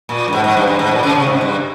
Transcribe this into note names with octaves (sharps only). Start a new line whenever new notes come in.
A#2
G2
G#2
G#2
G2
G2
G#2
A#2
C#3
C3
G#2
G2